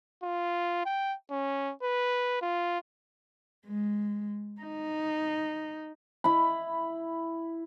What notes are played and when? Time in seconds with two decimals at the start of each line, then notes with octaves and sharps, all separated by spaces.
0.23 F4
0.86 G5
1.31 C#4
1.83 B4
2.42 F4
3.67 G#3
4.62 D#4
6.24 E4 B5